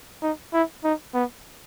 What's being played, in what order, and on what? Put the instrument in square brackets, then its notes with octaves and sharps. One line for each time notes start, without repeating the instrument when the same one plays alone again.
[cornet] D#4
E4
D#4
B3